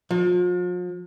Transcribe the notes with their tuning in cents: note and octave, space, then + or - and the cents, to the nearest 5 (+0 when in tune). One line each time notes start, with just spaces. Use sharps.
F3 +40